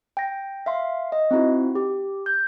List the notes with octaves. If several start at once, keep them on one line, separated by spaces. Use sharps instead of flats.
G5 A#6
E5 F5 C6
D#5
C4 D#4 E4 F#4
G4
G6